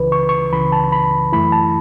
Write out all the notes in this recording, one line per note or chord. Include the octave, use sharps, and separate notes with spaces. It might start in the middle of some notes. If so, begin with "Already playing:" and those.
Already playing: C#2 C#3 E3 B4
C#6
C#6
C#2 C#3 E3 B5
A5
B5
F#2 E3 A3 E4 B5
A5